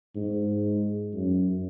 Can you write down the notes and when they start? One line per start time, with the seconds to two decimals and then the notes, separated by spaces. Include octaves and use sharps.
0.16 G#2
1.13 F#2